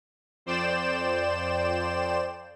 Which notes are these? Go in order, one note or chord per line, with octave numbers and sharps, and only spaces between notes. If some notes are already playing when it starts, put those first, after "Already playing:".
F2 C5 D5 G5 E7